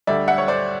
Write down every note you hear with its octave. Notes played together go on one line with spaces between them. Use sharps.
D2 D3 G3 D5 E5
E5 F#5
C#5
C5 D5